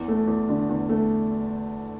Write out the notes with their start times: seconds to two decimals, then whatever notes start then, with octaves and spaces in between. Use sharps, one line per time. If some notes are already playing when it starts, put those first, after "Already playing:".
Already playing: E2
0.08 A3
0.27 E2
0.49 D3
0.69 E2
0.89 A3